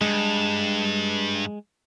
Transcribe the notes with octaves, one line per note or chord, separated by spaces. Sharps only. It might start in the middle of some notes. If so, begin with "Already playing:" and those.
G2 G#3